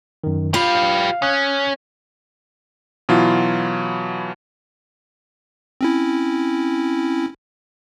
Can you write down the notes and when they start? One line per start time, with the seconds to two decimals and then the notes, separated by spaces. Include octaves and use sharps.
0.24 F#2 D#3
0.54 F4 G4 B4 F5
1.22 C#4 D#6 F#6
3.09 B2 E3 F#3 E4 F4
5.81 C4 C#4 E4